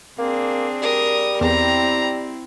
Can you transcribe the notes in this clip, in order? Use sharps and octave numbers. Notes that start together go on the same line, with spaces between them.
A#3 C4 D4 G#4
G3 A#4 D#6
E2 C4 E4 A#5